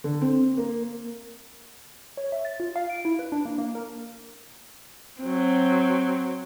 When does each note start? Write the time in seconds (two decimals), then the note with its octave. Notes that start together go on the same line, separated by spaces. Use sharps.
0.04 D3
0.21 C4
0.57 A#3
2.17 C#5
2.32 E5
2.45 A6
2.60 F4
2.76 F5
2.90 D7
3.05 E4
3.19 B4
3.32 D4
3.45 A#3
3.58 A#3
3.75 A#4
5.21 F#3 C4